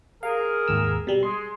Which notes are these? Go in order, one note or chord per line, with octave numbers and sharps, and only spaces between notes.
G#4 A#4 F5
G#1 D#2 E6
B2 G3
G#3 C6